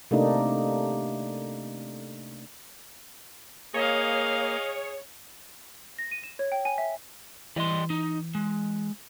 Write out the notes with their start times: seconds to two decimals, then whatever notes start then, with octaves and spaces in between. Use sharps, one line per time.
0.11 C3 A3 A#3 D4 D#4
3.74 A#3 G#4 C#5 D#5 F5
5.99 A#6
6.11 D#7
6.23 E7
6.39 C#5
6.52 G5
6.65 G#5
6.78 E5
7.56 E3 G3 D#5 C6
7.90 D#4
8.35 G#3